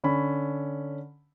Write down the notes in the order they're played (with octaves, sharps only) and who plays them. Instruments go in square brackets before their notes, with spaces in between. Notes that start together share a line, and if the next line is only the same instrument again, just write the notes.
[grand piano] D3 C#4 B5